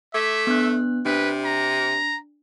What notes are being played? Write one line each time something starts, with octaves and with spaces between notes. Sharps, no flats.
A3 E5 D6 G#6 B6
B3 D4 F#6
C3 D4 B4
A#5